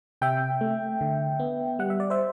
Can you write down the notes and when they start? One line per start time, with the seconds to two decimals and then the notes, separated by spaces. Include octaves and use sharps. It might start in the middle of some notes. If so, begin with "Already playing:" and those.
0.22 C3 E5 G5
0.61 A3
1.01 D3
1.39 B3
1.79 G3 F#5
1.90 E5
2.00 D5
2.10 C5 E5